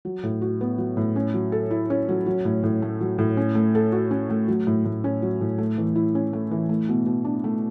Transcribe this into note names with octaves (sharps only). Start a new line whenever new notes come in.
F#3
A2
F#4
B3
F#3
A2
C#4
F#3
A4
E4
C#4
F#3
F#3
A2
A2
A3
F#3
A2
C#4
A3
A4
F#4
C#4
A3
F#3
A2
A2
C#4
F#3
A2
A3
E3
E4
C#4
A3
E3
A3
B2
B2
D4
A3